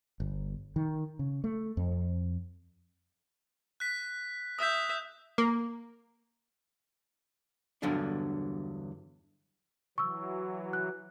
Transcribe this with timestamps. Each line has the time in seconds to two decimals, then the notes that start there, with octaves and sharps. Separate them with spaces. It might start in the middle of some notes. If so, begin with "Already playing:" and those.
0.20 G1
0.76 D#3
1.19 C#3
1.44 A3
1.77 F2
3.80 F#6 B6
4.59 E5 D#6 G6
5.38 A#3
7.82 E2 G2 D3 F#3 B3 D4
9.98 E3 F#3 C#6 E6
10.73 F#6